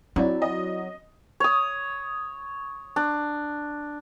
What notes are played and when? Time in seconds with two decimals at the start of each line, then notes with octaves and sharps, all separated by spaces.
0.16 F#3 C4 D#4 E4 D5
0.42 D#5
1.40 C#5 D#6
2.96 D4